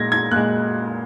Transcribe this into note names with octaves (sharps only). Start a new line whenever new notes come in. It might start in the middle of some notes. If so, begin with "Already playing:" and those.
Already playing: A#2 G#3 G#6 A#6
G#6
A#2 G#3 F#6